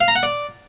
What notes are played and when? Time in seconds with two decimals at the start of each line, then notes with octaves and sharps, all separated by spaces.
0.01 F5
0.08 A#5
0.16 F#5
0.23 D5